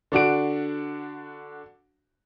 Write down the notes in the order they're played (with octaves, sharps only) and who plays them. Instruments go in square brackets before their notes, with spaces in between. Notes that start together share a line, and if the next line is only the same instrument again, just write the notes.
[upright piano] D3 D4 F#4 D7